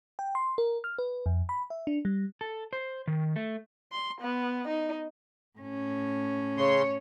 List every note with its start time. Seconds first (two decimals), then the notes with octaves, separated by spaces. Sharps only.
0.19 G5
0.35 C6
0.58 A#4
0.84 F6
0.99 B4
1.26 F2
1.49 B5
1.70 E5
1.87 D4
2.05 G3
2.41 A4
2.73 C5
3.08 D#3
3.36 A3
3.92 C6
4.21 B3
4.68 D#4
5.59 A2 C#4
6.58 C#3 C#5 C6